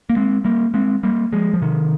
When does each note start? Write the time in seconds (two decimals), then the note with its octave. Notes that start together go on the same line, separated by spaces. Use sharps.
0.10 A#3
0.16 G#3 C4
0.44 G3 A#3
0.74 G#3 C4
1.03 G3 A#3
1.33 F3 G#3
1.54 F3
1.62 C3 D#3